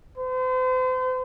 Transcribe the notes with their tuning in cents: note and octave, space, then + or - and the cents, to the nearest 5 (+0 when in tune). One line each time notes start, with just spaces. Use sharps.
C5 -40